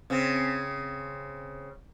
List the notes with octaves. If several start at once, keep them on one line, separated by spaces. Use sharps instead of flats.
C#3 C4